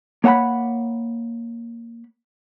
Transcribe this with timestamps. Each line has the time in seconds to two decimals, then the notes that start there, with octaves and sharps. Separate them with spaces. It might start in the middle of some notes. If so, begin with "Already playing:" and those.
0.24 A#3 C#5 F#5 A5 B5